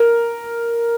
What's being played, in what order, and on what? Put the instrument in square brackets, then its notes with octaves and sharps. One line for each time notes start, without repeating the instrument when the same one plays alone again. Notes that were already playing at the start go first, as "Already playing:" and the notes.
Already playing: [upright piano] A#4